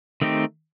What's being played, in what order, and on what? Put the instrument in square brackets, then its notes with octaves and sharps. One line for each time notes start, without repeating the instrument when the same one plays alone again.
[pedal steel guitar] D#3 A3 C4 D#4 G4